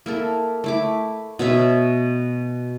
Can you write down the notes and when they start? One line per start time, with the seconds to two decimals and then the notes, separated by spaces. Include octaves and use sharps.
0.06 A#3 E4 A4
0.64 A3 E4 D6
1.39 B2 C#4 E5